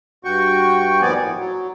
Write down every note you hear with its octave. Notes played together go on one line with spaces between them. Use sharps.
G2 F#4 G5 C#6
D#2 A#2 F3 B3 D5 G#5
A2
F#3